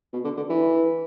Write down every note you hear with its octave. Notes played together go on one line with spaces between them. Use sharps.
B2
D3
D3
E3